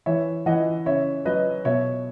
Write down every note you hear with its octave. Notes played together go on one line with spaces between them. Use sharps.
E3 C#5 E5
E3 D#5 F#5
C#3 C#5 E5
F#3 B4 D#5
B2 C#5 E5